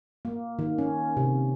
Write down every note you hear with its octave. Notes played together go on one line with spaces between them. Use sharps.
A#3
D#3
C#4
C3